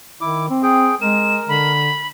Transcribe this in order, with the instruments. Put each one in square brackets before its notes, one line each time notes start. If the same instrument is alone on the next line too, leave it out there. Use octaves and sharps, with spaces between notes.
[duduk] D#3 [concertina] E4 D6
[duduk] C4
[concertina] G#4 G5
[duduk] G#3 [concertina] A#4 [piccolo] E7
[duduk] D3 [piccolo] B5